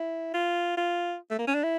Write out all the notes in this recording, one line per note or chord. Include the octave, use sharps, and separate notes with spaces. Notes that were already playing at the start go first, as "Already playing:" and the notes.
Already playing: E4
F4
F4
A3
A#3
C#4
D4
E4